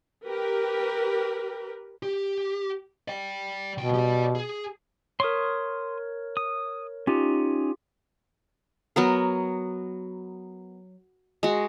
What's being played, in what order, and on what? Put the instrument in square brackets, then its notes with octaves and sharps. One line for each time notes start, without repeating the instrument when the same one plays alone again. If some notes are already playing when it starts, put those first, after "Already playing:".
[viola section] G4 A#4 B4
[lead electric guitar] G4
D5 G5
[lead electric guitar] C2 G5 [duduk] B2
[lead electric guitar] G4 D5
G#4
[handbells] A#4 C#5 [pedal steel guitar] C6 C#6 D#6
[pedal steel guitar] D#6
[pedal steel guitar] C#4 D#4 [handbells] F4 G4
[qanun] F#3 B3 A#4
G#3 F#4